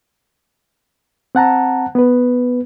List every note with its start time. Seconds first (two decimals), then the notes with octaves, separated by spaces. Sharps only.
1.35 C4 F#5 A5 A#5
1.95 B3 B4